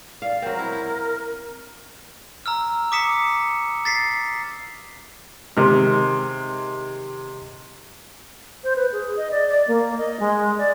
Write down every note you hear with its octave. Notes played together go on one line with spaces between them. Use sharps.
D5 F5
F#3 C4 A#4
E4
E4
A#5 E6 F6
D6 D#6 B6 C#7 E7
A6 B6 C7
C3 D#3 G#3 F6
C5
B4
G#4
D#5
D5
D5
A#3
D#5
G#3
D5